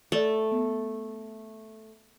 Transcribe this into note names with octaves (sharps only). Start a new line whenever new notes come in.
A3 A4 D5
B3